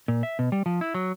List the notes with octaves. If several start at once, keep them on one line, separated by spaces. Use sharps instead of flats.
A#2
E5
B2
G3
F3
E4
F#3